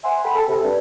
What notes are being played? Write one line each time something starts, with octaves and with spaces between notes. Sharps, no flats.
E5 F#5 G#5 C6
A4 G5 G#5 B5
A4
C3
G2